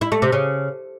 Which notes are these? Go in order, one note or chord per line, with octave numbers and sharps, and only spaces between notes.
E4
A3
C3
C#3